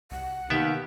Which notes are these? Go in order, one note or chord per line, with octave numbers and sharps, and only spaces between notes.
C2 F#5
D#2 C3 D#3 A#3 B3 G4 E5